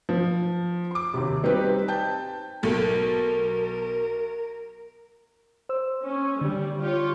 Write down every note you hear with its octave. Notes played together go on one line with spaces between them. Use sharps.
F3
C6 D6
D#2 C3
G3 C4 D#4 G4 B4
G5 A5 G6
B1 A4 A#4
C5 E6
C#4
D3 G3
F4 G4 C#5